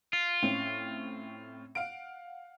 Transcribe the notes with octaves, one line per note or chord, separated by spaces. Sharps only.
F4
A2 C4 C#4
F5 F#5 D7